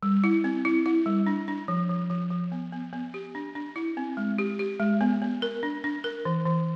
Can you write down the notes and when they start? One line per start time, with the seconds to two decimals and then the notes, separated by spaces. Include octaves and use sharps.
0.03 G3
0.24 E4
0.44 C4
0.65 E4
0.86 E4
1.06 G3
1.27 D4
1.48 D4
1.68 F3
1.89 F3
2.10 F3
2.30 F3
2.52 B3
2.72 B3
2.93 B3
3.14 G4
3.35 D4
3.55 D4
3.76 E4
3.97 C4
4.17 G#3
4.38 G4
4.59 G4
4.80 G#3
5.01 B3
5.22 B3
5.42 A#4
5.63 D4
5.84 D4
6.04 A#4
6.25 E3
6.46 E3